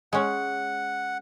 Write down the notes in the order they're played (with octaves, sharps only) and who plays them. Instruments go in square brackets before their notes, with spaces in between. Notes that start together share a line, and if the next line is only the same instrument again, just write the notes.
[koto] G#3 C#4 [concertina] F#5